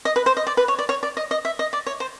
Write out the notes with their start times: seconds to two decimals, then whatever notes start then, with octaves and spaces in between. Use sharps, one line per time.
0.05 D#5
0.16 B4
0.26 C5
0.37 D#5
0.47 D5
0.57 B4
0.68 C#5
0.79 D5
0.89 C#5
1.03 D5
1.17 D#5
1.31 D#5
1.45 E5
1.59 D#5
1.73 D5
1.86 C#5
2.00 C5